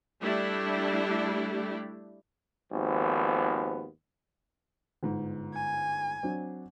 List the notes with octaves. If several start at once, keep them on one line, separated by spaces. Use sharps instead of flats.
G3 A3 D4 E4 G4
G#1 D#2 F3 B3
G1 G#2
G#5
F#3 C4 D4